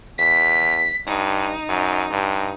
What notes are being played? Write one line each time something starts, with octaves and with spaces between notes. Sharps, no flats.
E2 B6
G2 D#4
F#2
G2